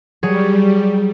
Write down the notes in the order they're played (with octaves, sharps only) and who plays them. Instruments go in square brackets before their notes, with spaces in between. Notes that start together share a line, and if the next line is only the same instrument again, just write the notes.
[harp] F#3 G#4 C#5 [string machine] G3